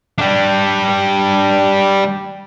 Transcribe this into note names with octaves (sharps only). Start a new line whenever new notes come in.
G3 D4